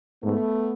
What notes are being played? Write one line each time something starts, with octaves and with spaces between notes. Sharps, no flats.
G#2 A3 B3